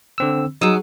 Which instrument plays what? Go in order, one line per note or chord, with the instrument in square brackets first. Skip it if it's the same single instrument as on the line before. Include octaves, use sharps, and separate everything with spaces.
[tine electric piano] D3 C4 E6
[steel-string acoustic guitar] F#3 G#4 [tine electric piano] D#4 D#6 E6